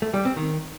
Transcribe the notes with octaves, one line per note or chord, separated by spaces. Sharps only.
A3
G3
C4
D#3